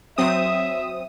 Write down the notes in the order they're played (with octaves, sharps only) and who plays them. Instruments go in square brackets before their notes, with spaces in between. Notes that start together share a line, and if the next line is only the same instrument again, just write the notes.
[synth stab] F#3 C4 D#6 [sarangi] E5